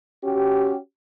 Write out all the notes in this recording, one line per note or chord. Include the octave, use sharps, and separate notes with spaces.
C#4 F#4 G4